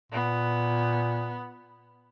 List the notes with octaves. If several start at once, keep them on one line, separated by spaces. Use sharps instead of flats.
A#2 B3